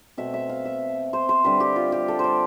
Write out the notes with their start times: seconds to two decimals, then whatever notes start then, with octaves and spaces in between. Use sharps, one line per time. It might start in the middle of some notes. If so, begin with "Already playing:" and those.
0.18 B2 A3 C4 E5
0.34 E5
0.49 F5
0.65 E5
1.13 C5
1.29 C5
1.44 D3 G3 C4 B4
1.60 G4
1.76 F4
1.92 G4
2.08 A4
2.19 C5 D5